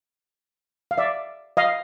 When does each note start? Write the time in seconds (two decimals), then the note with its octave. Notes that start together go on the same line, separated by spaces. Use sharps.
0.91 F5
0.98 D5 E5
1.57 D#5 F5